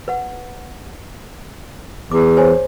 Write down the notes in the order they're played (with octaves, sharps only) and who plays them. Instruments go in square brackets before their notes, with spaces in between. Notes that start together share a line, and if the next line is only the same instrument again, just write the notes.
[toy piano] B4 F#5
[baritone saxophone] E2 [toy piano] D6
[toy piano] C5 C#5 G#5